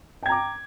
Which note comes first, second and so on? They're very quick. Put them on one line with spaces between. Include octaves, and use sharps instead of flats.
G5 G#6 A#5 D6